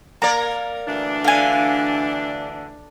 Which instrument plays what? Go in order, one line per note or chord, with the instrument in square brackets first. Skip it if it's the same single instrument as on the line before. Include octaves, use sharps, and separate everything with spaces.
[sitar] A#3 A#4 D5 [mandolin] A#5
[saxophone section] D2 E3 D4
[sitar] D3 [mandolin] F5 G#5